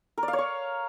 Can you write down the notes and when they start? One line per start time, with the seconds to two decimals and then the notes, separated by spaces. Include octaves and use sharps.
0.18 A#4
0.23 D5
0.28 F5
0.33 C#5
0.38 C#6